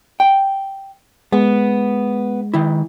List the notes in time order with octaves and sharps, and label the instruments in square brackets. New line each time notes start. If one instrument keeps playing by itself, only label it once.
[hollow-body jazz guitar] G5
[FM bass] G#3 [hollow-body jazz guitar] B3
[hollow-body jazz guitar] D#3 E4